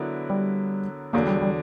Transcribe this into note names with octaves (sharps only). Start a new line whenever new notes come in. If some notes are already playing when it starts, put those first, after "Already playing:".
Already playing: D3 F#3 B3 E4 A#4
G3
E2 D3 F#3 A#3
G3
G3